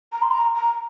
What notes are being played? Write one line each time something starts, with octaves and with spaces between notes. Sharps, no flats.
A#5
C6
A#5
A#5